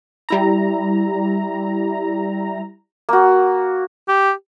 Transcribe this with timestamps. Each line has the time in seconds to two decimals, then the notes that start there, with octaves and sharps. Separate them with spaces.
0.29 G3 E4 A#5
3.09 A#3 F#4
4.08 G4